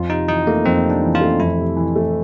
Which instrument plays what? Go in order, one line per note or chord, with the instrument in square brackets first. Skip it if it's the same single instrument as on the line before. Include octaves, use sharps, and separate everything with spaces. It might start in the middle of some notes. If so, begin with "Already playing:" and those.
Already playing: [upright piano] F2 [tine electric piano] F4
[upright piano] C3 [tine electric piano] D#4
[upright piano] E3 [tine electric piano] D#4
[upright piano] A3 [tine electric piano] A#3
[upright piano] F2 [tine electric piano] C4
[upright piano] C3
[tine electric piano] D4
[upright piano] E3
[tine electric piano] F4
[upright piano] A3
[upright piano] F2 [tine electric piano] E4
[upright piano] C3
E3
A3